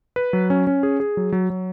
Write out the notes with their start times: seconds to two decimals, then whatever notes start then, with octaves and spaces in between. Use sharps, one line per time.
0.16 B4
0.33 F#3
0.50 C#4
0.67 C#4
0.83 G#4
1.00 G#4
1.17 F#3
1.32 F#3
1.50 F#3